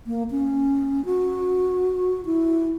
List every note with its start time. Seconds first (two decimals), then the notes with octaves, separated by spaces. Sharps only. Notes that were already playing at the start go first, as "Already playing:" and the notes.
0.07 A#3
0.31 C#4
1.05 F#4
2.26 E4